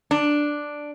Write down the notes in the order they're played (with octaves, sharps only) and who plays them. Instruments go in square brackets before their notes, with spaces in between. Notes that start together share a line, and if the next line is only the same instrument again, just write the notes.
[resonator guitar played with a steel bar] D4